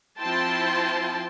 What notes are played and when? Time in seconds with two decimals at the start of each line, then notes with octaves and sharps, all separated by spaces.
0.20 F3 C4 E4 G5 A5 C6